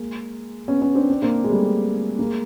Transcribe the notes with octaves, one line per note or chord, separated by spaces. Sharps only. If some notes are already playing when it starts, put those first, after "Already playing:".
Already playing: G#3 A#3
B3 C#4
B3 C#4
C4 D4
C4 D4
A#3 C4
G#3
G3 A3
G#3 A#3